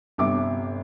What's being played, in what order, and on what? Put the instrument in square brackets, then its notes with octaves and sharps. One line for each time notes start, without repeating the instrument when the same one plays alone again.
[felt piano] G1 C3 E5 D6